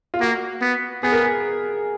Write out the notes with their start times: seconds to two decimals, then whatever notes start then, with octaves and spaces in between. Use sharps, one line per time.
0.14 F4
0.21 A#3 F#4
0.61 B3
1.03 B3 G#4
1.12 A#4
1.21 G#4